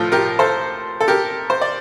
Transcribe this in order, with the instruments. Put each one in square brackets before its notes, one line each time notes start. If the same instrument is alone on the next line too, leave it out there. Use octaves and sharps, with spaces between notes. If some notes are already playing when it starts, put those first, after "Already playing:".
Already playing: [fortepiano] A2 F3 F4 A4
G4 A#4
A4 C5
A4
G4 A#4
C5
D5